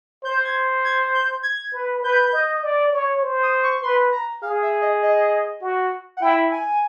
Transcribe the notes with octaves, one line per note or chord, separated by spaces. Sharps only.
C5 G6
G#6
G#6
G6
G#6
B4
B4 G6
D#5
D5
C#5
C5
D#6
C#6
B4 C6
A#5
G#4 F5
E5
D#5
D#5
F#4
F#5
E4 G5
G#5